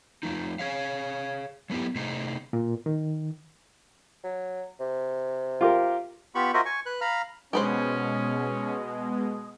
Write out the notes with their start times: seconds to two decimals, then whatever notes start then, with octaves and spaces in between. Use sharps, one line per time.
0.23 F3 A3 D#4
0.59 G#4 C#5 F5
1.70 F#3 A3 B3 E4 G4
1.95 C3 A3 D#4 G#4
2.53 A#2
2.86 D#3
4.24 F#3
4.80 C3
5.61 F4 G4 A#4
6.35 B3 F4 G4 B5 C#6
6.54 F4 F#4 A#4 C5 D#5 E5
6.65 G#5 C#6
6.86 B4 F#6
7.01 F5 A#5 B5 F6
7.53 B2 G#3 C#4 G4 B4 C5 D#6